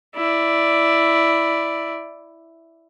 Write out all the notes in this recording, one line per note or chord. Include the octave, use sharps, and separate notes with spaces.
E4 D5